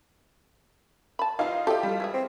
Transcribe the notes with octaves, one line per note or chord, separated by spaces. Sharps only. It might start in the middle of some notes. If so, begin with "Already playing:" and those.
A5 B5
E3 G3 D#4 F4 F5
E4 G4 A4 D#5
G3
E3 E4 G#4
C4